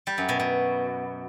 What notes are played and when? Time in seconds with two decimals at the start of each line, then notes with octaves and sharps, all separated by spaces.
0.07 G3
0.18 F#2
0.29 B2
0.40 B2